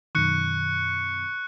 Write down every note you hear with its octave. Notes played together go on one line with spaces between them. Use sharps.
F#2 B2 D#3 C#6 F#6 C#7